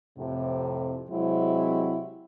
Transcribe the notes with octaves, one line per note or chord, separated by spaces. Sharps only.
F2 A2 C3
C3 F#3 G#3 C4 E4